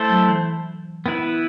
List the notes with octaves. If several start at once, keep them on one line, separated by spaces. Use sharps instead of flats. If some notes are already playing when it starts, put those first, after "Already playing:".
Already playing: A3 E4 A4 C5
F#3
E3
B3 E4 B4